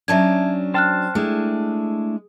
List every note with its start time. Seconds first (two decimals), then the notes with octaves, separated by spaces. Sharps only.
0.08 F#3 C#4 D4 E5 A5 G#6
0.74 C5 G5 A5 F6 F#6
1.15 G#3 A3 D4 E4